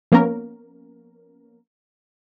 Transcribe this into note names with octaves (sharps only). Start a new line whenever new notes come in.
F3 A#3 B3 C#4 A#4